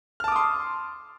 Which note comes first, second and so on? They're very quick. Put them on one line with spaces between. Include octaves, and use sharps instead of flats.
F6 A5 D6 D#6 C6